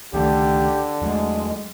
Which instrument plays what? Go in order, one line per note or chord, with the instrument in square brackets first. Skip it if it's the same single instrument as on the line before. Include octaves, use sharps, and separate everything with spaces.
[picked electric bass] C#2 D#3 A3 [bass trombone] D3 [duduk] G4
[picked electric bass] E2 F#3 A3 [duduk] G#3